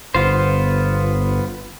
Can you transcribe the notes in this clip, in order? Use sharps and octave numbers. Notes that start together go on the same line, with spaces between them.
G1 B3 F4 C5